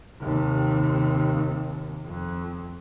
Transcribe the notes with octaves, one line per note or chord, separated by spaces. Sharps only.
D#2 C3
F2